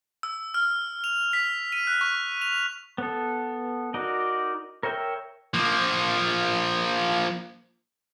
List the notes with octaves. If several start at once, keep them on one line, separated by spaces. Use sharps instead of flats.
E6
F6
F7
B6
D#7
F#6
C#6
F7
B3 A4
D#4 F#4 A#4 D5 D#5
A#4 C#5 E5 G5
F3 A#3